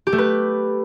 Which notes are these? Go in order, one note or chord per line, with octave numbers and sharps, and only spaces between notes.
G4
A3
B4